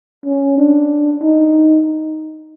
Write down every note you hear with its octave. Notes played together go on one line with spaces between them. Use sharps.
C#4
D4
D#4